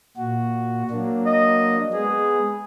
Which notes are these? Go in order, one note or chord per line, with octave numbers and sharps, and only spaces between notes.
A#2 F#4
F#3 A#3 D4
D#5
G#3 B3 G#4